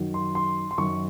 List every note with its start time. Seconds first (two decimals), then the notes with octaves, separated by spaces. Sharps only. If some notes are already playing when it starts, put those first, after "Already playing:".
Already playing: F#2 D#3 F#3
0.14 C6
0.35 C6
0.71 C6
0.78 F#2 D#3 F#3 C#6